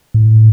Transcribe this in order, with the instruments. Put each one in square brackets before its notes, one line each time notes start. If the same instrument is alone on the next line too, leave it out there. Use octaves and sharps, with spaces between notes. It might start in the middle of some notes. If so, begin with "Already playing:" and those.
[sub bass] A2